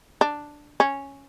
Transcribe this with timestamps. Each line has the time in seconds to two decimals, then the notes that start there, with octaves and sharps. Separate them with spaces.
0.21 D4
0.80 C#4